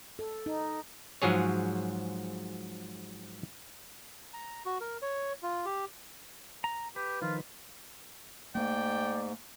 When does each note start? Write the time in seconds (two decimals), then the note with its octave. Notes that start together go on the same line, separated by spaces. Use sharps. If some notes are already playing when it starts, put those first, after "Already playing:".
0.19 A4
0.46 D#4
1.22 G#2 F3 F#3 G#4 C#5
4.34 A#5
4.65 F#4
4.81 A#4
5.02 C#5
5.43 F4
5.65 G4
6.64 A#5
6.96 G4 B4
7.22 D#3 F3 F4
8.55 G#2 A3 A#3 D5 G5